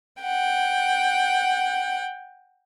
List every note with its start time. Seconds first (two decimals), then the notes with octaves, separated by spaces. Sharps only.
0.22 F#5 G5